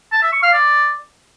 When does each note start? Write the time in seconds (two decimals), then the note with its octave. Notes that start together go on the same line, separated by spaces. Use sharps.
0.12 A5
0.22 E5
0.33 C#6
0.43 F5
0.53 D5